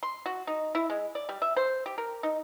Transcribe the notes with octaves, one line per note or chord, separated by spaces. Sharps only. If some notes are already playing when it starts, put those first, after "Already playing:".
C6
F#4
D#4
E4
G#3
D5
G3
E5
C5
G4
A#4
D#4